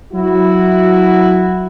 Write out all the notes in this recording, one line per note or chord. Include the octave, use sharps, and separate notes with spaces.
F#3 E4 F#4